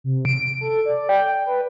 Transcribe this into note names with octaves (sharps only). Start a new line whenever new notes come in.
C3
D7
A4
D5
G5
B4